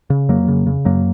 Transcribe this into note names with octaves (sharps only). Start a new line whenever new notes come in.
C#3
F2 F#3 A#3
C#3
C#3
F#2 F#3 A#3